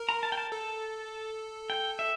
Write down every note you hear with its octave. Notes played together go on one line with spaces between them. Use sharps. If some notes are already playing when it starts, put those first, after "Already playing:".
Already playing: A#4
A#5
A5
G5
A5
A4
G5
E5